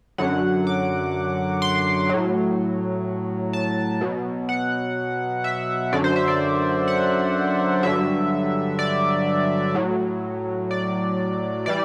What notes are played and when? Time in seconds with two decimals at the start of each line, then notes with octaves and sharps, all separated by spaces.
0.18 F#2 D3 F#3 F#5
0.67 D6
1.62 C6
2.09 A2 F#3
3.53 A5
4.01 B2 F#3
4.49 F#5
5.44 E5
5.93 F#2 D3 F#3 D5
6.04 C5
6.16 E5
6.28 D5
6.88 F#5
7.83 G2 D3 F#3 E5
8.79 D5
9.75 A2 F#3
10.71 D5
11.66 E3 G3 D5